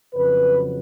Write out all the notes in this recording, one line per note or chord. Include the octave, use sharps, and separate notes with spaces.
F2 C#3 F#3 B4